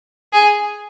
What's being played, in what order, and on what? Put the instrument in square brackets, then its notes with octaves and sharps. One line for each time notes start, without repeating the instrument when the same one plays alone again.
[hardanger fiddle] G#4